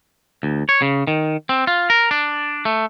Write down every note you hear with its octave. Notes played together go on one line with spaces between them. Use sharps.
D2
C#5
C#3
D#3
C4
F4
A#4
D4
A3